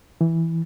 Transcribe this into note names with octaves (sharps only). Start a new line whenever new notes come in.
E3